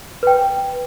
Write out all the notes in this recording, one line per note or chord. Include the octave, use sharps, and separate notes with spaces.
B4 G5